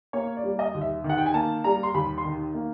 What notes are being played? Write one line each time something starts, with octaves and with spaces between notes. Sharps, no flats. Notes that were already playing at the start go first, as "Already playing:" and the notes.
A#3 C#5
D5
G3
D#5
D#2
E5
D#3
F#5
G5
G#5
A#3 A5
G3 A#5
C6
D#2 B5
C6
D#3
A#3